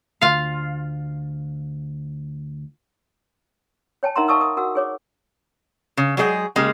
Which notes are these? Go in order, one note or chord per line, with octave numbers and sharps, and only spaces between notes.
D2 F4 F5
C#5 G5 A5
D#4 A#4 E5 F#5 A#5 C6
D#5 F5 A5 C#6 D#6 E6
A#4 D#6
F#4 A#4 F#5 E6
G#4 C#5 D6
C#3
F#3 G#3 G#4 D5 G5
C#3 G#3 A#3 G4